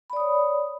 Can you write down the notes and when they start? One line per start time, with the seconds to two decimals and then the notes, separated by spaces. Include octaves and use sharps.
0.10 B5
0.13 D5
0.16 D#6
0.20 C#5